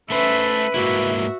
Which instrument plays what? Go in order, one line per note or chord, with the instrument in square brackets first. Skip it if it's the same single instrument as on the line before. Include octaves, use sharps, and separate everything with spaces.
[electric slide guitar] A3 C5 [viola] C#4 E5 [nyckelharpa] B4
[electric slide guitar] G#2 A#3 E4 [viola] F#4 E5